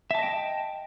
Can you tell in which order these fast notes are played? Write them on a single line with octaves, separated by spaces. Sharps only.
E5 A5 D#5 G5